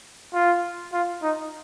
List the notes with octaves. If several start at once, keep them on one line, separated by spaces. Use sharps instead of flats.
F4
F4
D#4